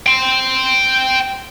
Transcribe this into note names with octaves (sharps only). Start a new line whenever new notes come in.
G5 C6